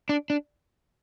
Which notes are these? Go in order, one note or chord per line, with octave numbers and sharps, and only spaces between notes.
D4
D4